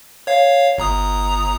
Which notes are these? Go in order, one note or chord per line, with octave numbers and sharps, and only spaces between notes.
C#5 F5
G1 A#5 D#6